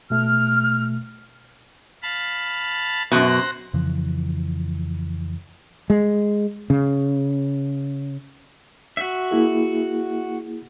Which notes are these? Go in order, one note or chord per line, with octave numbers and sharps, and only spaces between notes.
B2 A3 F6
F5 A5 B5
F#2 B2 C5 F#6 A#6
F2 C#3 E3 F3
G#3
C#3
F#4 E5
A#3 E4 G#4